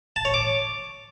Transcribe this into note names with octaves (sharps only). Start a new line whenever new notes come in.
A5
C#5
D6